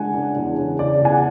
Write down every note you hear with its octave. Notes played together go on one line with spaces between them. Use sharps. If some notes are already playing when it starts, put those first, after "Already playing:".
Already playing: C#3 G#3 D4 F#5 G#5
D4
E2
C#3
C#3 D5
E2 G#5
F#5